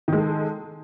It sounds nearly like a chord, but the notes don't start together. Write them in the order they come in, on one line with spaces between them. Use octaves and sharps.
D#3 G#3 A4